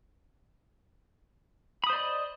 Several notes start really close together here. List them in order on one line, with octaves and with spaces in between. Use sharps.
B5 D#6 C5 D5 D#5